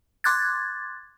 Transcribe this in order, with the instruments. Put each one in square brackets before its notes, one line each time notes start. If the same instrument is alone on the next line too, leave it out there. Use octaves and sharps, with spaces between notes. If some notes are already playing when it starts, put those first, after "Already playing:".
[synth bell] C6 D6 F#6 G#6 A6